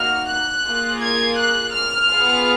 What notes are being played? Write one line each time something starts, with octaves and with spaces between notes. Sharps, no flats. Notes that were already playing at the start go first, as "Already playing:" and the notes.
Already playing: A#3 D#4 F#4 F6
F#6
A#3 F4 G#4
G#6
F#6
F6
B3 F4 G#4